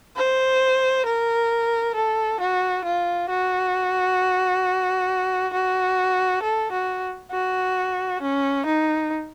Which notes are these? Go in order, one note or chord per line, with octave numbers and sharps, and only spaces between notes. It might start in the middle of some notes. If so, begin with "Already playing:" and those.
C5
A#4
A4
F#4
F4
F#4
F#4
A4
F#4
F#4
C#4
D#4